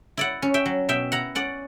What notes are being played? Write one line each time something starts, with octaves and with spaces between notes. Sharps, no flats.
E4 D5 F#5
C#4
E5 G5
F#3
B2 E5 G5
E4 F#5 A#5
C#4 D5 F#5